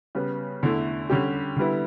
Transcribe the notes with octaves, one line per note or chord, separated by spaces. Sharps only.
C#3 G3 B3
E2 D3 A3 E4
D3 G3 C#4 G4
D3 G3 B3 E4